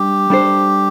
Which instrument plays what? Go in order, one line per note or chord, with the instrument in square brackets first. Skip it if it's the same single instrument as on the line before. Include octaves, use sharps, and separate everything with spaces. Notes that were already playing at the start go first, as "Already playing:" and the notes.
Already playing: [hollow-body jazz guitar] G3 D4 [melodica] G4
[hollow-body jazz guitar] G3 D4 A4 C5